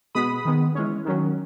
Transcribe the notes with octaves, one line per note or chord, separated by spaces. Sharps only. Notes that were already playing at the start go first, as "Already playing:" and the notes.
B2 G#3 B3 B5 D#6
D#3 G#3 B3
E3 G#3 C#4
D#3 F#3 C#4